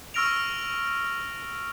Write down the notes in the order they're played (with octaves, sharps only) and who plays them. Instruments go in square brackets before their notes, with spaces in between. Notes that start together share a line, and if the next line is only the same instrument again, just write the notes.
[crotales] C#6 E6 F6 A#6 D7 F7